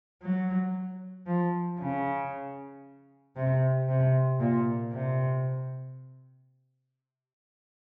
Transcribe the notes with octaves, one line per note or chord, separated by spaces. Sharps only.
F#3
F3
C#3
C3
C3
A#2
C3